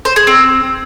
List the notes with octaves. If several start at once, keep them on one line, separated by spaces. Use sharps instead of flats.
C5
G#4
C4